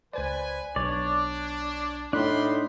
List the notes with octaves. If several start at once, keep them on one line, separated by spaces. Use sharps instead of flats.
C#2 B4 C5 D5 G#5
B1 D4 C#5 D5
A2 D4 D#4 F4 B5 C6 F#6